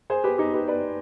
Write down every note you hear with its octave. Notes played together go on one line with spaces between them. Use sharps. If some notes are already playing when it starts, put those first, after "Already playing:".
G#4 C5
G4 B4
D#4 G4
G4 B4
B4 D5